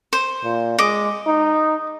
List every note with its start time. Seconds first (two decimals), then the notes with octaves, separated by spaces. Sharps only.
0.13 C5
0.44 A#2
0.79 G#3 D#5 D6
1.27 D#4